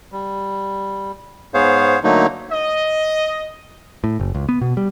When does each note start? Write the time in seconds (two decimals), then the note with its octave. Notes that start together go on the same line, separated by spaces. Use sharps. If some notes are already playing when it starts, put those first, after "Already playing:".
0.12 G3
1.54 G#2 B3 G#4 C5 C#5 F5
2.04 D3 F#3 A3 A#3 D#4
2.52 D#5
4.04 A2
4.20 F#1
4.35 C#2
4.49 B3
4.61 B2
4.77 G3